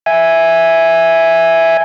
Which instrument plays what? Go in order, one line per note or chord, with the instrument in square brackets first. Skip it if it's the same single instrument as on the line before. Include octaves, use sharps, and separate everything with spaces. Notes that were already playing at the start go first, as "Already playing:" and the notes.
[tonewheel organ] E5 G#5